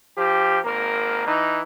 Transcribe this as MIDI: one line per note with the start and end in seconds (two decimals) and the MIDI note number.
0.18 0.59 53
0.18 0.59 67
0.64 1.27 32
0.64 1.27 58
0.64 1.27 70
1.27 1.60 52
1.27 1.60 63